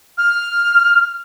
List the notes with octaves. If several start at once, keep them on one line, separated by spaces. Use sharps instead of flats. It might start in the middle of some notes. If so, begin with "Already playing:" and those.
F6